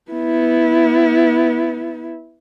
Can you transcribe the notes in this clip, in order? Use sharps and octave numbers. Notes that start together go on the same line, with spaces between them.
B3 E4